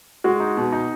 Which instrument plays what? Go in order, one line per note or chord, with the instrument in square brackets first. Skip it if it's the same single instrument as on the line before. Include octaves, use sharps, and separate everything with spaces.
[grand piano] G#3 [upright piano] F#4
[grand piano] D#4
B2
D#4